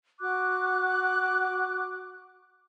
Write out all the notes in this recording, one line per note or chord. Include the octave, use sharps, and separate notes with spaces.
F#4 D6 F#6